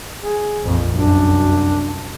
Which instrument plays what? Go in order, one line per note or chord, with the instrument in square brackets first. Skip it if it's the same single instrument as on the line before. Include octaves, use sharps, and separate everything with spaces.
[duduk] G#4
[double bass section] A#1 F2
[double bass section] C2 F#2 [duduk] D4